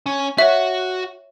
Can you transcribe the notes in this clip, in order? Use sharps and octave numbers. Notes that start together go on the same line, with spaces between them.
C#4
F#4 C#5 E5 F#5